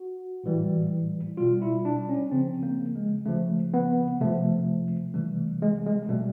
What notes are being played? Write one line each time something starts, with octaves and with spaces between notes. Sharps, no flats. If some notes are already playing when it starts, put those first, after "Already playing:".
Already playing: F#4
A2 E3 G3
B2 G3 F4
E4
D4
C#4
C#3 F3 C4
A#3
G#3
C#3 F3 A3
B3
C3 F3 A3
C3 E3 G3 A3
G#3
G#3
B2 G3 A3